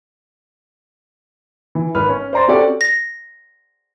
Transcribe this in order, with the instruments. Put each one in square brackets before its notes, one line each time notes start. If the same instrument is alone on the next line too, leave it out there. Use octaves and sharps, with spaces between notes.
[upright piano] E3
G#1 B4 F6
C#4
C5 D5 A#5 C6 A6
C4 C#4 F#4 G4 A4 D5
[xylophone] A#6